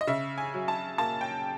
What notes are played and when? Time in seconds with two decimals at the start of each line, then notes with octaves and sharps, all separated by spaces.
0.01 D#5
0.07 C#3 E5
0.38 G#5
0.54 F#3
0.68 A5
0.98 A#3 A5
1.21 G5